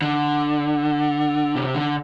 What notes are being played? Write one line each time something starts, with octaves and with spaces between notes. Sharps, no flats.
D3
C3
D3